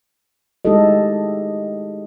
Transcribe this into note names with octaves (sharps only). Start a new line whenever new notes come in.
G#3 D#4 E4 G4 A4 D#5